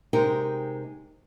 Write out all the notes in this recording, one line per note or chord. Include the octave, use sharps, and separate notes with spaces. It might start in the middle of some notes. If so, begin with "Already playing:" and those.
C3 G#3 D#4 G4 A#4